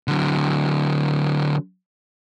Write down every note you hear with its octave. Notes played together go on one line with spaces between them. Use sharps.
D3 F#3